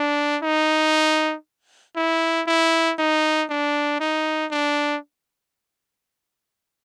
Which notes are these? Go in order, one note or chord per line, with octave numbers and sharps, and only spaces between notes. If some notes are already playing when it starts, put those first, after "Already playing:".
Already playing: D4
D#4
E4
E4
D#4
D4
D#4
D4